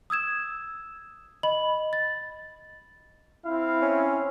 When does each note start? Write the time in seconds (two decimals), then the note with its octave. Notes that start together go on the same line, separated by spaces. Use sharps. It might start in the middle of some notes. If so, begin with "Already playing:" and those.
0.10 D#6 E6 G#6 E7
1.43 D#5 B5 F#7
1.93 A6
3.45 C4 E4 F5
3.82 C#4